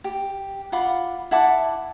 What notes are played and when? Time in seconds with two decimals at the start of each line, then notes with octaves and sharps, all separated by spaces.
0.04 G4
0.72 F4 F#5 B5 D6
1.31 E4 F#5 A5 D6